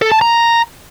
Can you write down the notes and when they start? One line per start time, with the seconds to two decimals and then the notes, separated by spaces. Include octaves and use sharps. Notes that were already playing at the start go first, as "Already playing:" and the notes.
0.02 A4
0.12 A5
0.21 A#5